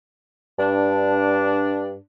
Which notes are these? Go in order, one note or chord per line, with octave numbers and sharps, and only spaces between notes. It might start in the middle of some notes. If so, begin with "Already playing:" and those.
G2 D4